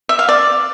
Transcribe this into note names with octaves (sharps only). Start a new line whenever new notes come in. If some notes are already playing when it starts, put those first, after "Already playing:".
E5
F5
D5